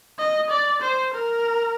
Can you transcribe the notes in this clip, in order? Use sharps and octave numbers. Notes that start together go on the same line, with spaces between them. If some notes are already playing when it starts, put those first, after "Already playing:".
D#5
D5
C5
A#4